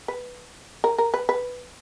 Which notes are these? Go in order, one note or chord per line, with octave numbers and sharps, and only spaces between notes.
B4
A#4
A#4
B4
B4